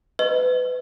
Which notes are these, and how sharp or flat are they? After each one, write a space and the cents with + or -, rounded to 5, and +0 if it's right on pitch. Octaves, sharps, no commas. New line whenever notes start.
B4 +30 D#5 +0